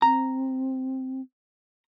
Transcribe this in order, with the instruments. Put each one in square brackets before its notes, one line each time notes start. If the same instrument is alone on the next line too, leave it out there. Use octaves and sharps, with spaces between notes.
[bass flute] C4 [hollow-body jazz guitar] A#5